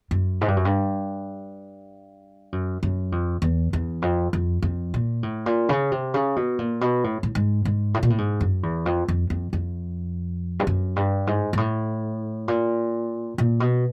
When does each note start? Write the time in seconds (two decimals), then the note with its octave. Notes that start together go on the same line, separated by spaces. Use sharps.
0.11 F#2
0.41 G#2
0.48 G2
0.56 F#2
0.65 G2
2.52 F#2
2.83 F#2
3.12 F2
3.42 E2
3.73 E2
4.02 F2
4.33 F2
4.62 F2
4.94 A#2
5.23 A2
5.46 A#2
5.69 C#3
5.92 C3
6.14 C#3
6.36 B2
6.59 A#2
6.81 B2
7.04 A2
7.23 A2
7.35 G#2
7.65 G#2
7.94 A2
8.03 A#2
8.10 A2
8.18 G#2
8.41 F#2
8.63 E2
8.86 F2
9.08 F2
9.30 F2
9.53 F2
10.59 G2
10.67 F#2
10.96 G2
11.27 G#2
11.53 G#2
11.57 A2
12.48 A#2
13.38 A#2
13.60 B2